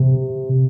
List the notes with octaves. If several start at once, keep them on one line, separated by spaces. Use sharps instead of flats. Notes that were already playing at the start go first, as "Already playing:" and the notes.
Already playing: C3